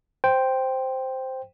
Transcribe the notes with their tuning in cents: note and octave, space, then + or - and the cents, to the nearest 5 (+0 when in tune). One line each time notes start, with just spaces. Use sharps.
C5 +0 G5 +0